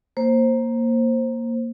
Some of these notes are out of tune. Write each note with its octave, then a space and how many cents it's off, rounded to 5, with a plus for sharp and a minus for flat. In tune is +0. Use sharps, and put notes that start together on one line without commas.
A#3 +0 C5 +15